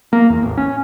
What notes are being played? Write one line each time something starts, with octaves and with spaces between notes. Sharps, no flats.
A#3
E2
A1
C#4